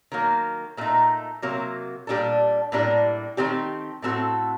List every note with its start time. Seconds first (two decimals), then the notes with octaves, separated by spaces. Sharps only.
0.12 D#3 F#3 A#3
0.77 A#2 A3 D#4
1.42 C3 F#3 A#3
2.07 A#2 G3 D4 A4
2.72 A2 G3 A#3 D4
3.37 D#3 A3 C4 G4
4.02 A2 A3 C4 F#4 A4